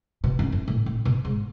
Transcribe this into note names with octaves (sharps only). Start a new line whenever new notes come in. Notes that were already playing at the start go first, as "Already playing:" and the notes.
B2
F#2
F#2
A2
A2
B2
G#2